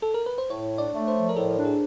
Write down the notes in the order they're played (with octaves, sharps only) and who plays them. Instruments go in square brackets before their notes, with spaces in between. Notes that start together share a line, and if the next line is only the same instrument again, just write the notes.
[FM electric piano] A4
A#4
B4
C5
[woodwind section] A2 [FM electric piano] C#5
[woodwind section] D4
[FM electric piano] D5
[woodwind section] A3
[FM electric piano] C5
[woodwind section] F3
[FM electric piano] A#4
[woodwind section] A2 [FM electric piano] A4
[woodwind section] D4
[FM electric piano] G#4